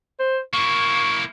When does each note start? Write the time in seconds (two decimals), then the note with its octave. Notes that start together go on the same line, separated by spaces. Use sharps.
0.19 C5
0.53 A#3 E4 C#6